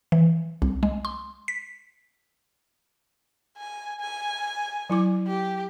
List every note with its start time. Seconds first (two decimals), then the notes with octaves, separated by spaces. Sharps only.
0.12 E3
0.62 C2
0.83 G#3
1.05 C6
1.48 B6
3.58 G#5
4.00 G#5
4.90 F#3 E4 D6
5.27 G4